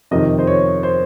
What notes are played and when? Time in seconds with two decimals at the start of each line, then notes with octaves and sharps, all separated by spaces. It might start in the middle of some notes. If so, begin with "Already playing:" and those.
0.11 F2 C3 D#3 D#5
0.39 C5
0.47 C#5
0.83 C5